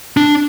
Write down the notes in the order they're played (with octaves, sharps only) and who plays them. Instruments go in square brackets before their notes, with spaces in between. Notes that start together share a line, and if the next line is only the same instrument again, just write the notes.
[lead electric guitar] D4